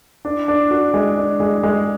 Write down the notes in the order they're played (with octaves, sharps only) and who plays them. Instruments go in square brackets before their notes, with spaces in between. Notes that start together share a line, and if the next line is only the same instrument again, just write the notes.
[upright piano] D4
D4
F#4
G#3
D4
G#3
G#3